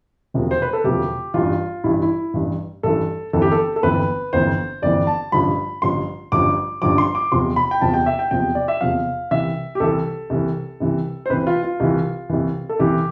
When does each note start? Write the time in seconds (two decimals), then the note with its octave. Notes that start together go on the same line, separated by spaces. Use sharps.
0.34 E1 D2 C3 F3
0.51 C5
0.62 B4
0.73 A4
0.84 E1 D2 C3 F3 G4
1.34 A1 G2 E3 F4
1.84 A1 G2 E3 E4
2.02 E4
2.33 A1 G2 E3
2.83 A1 G2 E3 A4
3.33 G1 F2 E3 A4
3.42 G4
3.52 A4
3.76 A4
3.83 G1 F2 E3 B4
4.33 G1 F2 E3 C5
4.82 G1 F2 E3 D5
5.07 A5
5.32 A1 G2 D3 F3 B5
5.82 A1 G2 D3 F3 C6
6.32 A1 G2 D3 F3 D6
6.82 A1 G2 D3 F3 D6
6.98 C6
7.15 D6
7.32 F1 E2 C3 F3 C6
7.56 B5
7.71 G5
7.81 F1 E2 C3 F3 A5
7.94 G5
8.06 E5
8.19 G5
8.31 F1 E2 C3 F3 G5
8.55 D5
8.68 E5
8.81 F1 E2 C3 F3 F5
9.31 C2 C3 E3 E5
9.75 G4
9.80 C2 C3 E3 A4
10.30 C2 C3 E3
10.80 C2 C3 E3
11.26 C5
11.30 C2 C3 E3 B4
11.47 F4
11.63 F4
11.80 C2 C3 E3
12.29 C2 C3 E3
12.69 A4
12.79 C2 C3 E3 G4